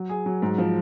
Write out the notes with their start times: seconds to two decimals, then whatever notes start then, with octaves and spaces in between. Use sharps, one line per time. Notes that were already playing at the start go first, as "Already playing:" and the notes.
Already playing: F#3
0.09 G#4
0.26 F#3
0.42 G#2
0.58 F3